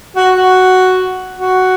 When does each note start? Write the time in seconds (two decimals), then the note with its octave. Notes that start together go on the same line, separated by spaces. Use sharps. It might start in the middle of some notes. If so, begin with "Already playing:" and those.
0.16 F#4
0.36 F#4
1.36 F#4